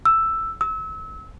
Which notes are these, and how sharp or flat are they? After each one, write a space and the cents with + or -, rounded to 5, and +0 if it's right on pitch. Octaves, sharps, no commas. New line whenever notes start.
E6 +5
E6 -30